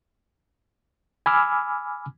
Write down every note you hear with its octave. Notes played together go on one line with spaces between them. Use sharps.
G#5 B5 D6 E6 F6